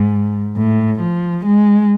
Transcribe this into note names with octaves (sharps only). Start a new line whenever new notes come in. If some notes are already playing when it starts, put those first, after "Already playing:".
Already playing: G#2
A2
F3
G#3